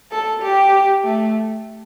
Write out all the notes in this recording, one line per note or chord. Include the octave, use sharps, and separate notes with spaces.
A4
G4
A3